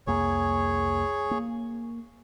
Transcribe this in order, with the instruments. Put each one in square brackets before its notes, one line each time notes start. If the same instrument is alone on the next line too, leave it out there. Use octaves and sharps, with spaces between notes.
[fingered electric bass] C2 F2 A#3 [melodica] G#4 C#5
[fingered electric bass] A#3